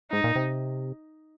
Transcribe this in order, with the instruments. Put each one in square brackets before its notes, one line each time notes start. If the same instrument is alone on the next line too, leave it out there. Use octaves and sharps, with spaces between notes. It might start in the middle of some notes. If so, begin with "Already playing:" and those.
[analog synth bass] G#2 [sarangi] D#4
[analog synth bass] A#2
C3